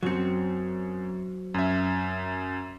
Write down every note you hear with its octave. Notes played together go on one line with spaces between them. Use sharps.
F#2 F#3 C4 C#7
F#2 E5